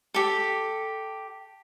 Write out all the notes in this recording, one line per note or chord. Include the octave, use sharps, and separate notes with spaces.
G4 A4